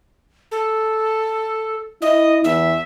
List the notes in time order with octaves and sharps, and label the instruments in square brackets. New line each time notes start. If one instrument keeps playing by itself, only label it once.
[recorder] A4
[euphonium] E4 [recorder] D#5
[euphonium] E2 [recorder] E5